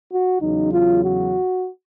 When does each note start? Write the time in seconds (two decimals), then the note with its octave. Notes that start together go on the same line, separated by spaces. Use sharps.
0.10 F#4
0.41 E2 C#3 F#3 D#4
0.71 F4
1.02 F#4